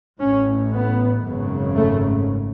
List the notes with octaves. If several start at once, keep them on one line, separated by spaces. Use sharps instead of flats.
A1 A2 C#4
B3
G#1 F#2 C#3
A3